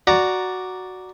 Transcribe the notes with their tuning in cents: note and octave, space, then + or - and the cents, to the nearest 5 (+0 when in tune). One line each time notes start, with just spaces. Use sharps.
F#4 +0 D5 +0 A#5 +0